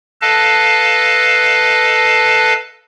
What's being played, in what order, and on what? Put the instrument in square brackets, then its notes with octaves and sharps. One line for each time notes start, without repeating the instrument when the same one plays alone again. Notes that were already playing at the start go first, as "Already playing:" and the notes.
[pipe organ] A4 B4 D#5 F5 A5